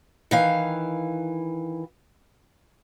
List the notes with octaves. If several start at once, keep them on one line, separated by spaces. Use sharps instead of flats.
D#3 E3 F5